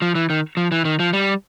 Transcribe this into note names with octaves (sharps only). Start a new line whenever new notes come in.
F3
E3
D#3
F3
E3
D#3
F3
G3